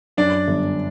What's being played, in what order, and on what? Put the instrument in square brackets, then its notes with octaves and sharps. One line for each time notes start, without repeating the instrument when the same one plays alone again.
[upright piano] F#2 [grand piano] D4 D5
[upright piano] G1